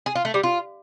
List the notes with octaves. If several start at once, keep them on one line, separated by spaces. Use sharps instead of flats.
G#4
F4
A3
G3
F4